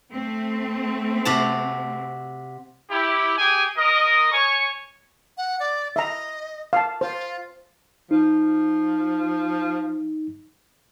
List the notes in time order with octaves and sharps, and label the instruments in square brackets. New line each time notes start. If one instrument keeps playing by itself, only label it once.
[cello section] A3 C4
[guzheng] C3 F#4 A5
[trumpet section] E4 G4
G4 G#4 G#5
A#4 D#5
C#5 G#5 C#6
[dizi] F#5
D5
[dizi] D#5 [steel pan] E5 A#5
[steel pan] F5 A5
[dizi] F4 [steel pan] C5
[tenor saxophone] F3 [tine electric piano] D#4